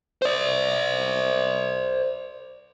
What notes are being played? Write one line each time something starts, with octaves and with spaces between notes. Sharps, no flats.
C5 D5